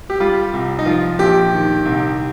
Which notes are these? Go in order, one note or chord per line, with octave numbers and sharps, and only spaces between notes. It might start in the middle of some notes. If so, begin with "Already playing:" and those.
G4
G3 F4
C2
D#4
F3 F4
A#1 G4
D#3
C2